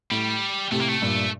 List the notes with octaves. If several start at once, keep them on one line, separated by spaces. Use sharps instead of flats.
A2 G3
A2 C3 A3
A#3
A3
G2 A#2